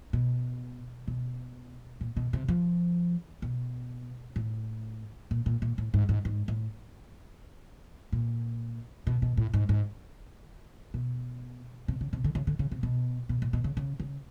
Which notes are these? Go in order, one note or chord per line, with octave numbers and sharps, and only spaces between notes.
B2
B2
A#2
B2
C3
F3
B2
A2
A#2
A#2
A#2
A2
G#2
G#2
G#2
A2
A#2
B2
B2
A2
G#2
G#2
B2
C3
C#3
C3
D3
C#3
D3
C#3
C3
B2
B2
A#2
B2
C#3
C#3
C#3